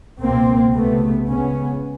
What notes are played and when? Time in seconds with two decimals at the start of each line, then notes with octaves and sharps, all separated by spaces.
0.21 C#2 B2 A#3 C4
0.75 C#2 C3 A3 B3
1.29 C#2 C#3 B3 C#4